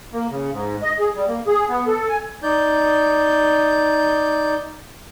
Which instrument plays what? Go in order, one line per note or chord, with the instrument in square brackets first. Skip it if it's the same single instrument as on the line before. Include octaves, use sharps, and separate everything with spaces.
[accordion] A#3
C#3
G#2
D#5
G#4
G3
A#3
G#4
B3
A4
G#5
[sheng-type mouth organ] D#4 D5 G6